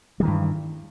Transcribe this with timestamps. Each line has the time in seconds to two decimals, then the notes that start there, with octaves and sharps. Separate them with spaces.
0.20 G3
0.22 D#3
0.25 E3
0.28 G2